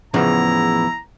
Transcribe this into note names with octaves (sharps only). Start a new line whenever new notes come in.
E2 A2 C#3 F3 B3 E4 A#5